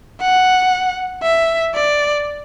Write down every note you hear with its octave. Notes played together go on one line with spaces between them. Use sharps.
F#5
E5
D5